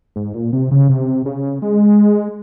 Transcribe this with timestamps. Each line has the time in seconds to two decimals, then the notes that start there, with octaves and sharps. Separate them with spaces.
0.16 G#2
0.34 A#2
0.53 C3
0.71 C#3
0.89 C3
1.26 C#3
1.62 G#3